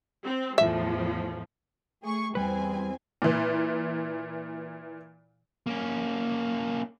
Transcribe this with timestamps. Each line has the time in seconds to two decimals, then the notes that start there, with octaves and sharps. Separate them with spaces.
0.23 C4
0.58 E2 A2 F3 E5
2.03 A3 G#4 C#6
2.35 E2 G3 C4 B4 G#5
3.22 A#2 E3
5.67 A#3 C#4